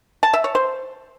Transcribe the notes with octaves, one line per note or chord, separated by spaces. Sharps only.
A5
E5
C#5
C5